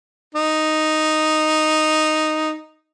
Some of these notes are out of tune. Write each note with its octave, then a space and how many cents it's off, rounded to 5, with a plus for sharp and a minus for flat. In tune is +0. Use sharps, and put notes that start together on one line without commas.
D#4 -5